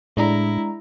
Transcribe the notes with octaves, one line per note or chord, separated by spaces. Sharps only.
A2 G#3 D4 E4 A#5